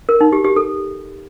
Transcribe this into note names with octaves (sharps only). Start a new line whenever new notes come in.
A#4
D#4
G4
G4
A4